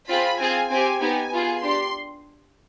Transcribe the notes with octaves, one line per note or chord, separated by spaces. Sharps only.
C4 F4 G#4 B5
C4 F4 G#4 G#5
C4 G4 G#5
B3 D#4 G4 G#5
B3 F4 G#4
D4 G4 C6